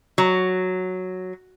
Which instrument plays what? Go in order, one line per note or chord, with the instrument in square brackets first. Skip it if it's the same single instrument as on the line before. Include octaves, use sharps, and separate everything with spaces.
[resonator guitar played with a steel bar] F#3